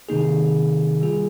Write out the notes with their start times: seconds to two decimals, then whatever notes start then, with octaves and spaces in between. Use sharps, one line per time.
0.09 C3 D#3 A#3 D#4 G#4
1.02 G3 A#3 F4 G#4